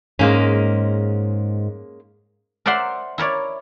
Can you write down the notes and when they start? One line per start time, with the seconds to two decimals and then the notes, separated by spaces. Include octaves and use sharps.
0.19 G#2 G#3 A#3 C#4
2.66 A#4 C5 D5 E5 F#5 C6
3.18 E4 A#4 C#5 D5